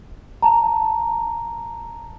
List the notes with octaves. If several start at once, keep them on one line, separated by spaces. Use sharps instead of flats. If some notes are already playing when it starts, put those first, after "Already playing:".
A5 A#5